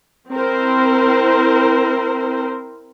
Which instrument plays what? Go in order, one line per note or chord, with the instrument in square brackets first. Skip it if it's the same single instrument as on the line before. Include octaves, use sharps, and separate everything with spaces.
[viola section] C4 E4 A#4 C5